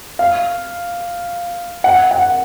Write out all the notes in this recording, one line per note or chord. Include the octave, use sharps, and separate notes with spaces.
F5
F#5
F#5